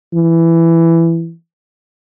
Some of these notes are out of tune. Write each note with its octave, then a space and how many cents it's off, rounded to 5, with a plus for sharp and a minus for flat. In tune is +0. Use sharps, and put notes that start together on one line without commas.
E3 +10